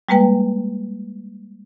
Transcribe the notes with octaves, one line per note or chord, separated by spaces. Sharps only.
G3 G#3 A#3 B4 G5